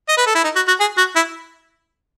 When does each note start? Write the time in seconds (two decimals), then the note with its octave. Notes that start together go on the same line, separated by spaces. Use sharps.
0.09 D#5
0.17 B4
0.26 A4
0.35 E4
0.44 D#4
0.56 F#4
0.68 F#4
0.80 G#4
0.98 F#4
1.16 E4